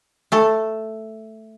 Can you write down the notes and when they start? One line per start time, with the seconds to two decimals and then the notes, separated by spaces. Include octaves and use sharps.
0.32 A3 A4